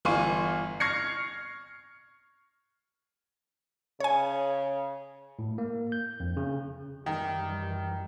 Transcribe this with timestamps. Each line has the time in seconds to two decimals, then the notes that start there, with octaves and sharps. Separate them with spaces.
0.05 G1 E3 F5 C6 C#6 D#7
0.80 C#6 F6 G#6 A#6 C7 C#7
4.00 C#3 C#5 G#5
5.39 A2
5.58 A#3
5.92 G6
6.20 F2
6.37 C#3
7.06 F#2 D#3 E3 G3